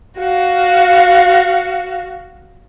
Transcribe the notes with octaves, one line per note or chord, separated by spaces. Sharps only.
F#4 F5